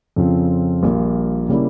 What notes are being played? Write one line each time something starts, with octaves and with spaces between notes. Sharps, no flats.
F2 C#3 F3 C4 F4
A#1 A#2 G3 A#3 F4
C#3 G3 A#3 E4